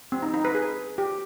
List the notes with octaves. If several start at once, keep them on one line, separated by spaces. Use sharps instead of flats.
C4
D#4
D#4
B4
G#4
G4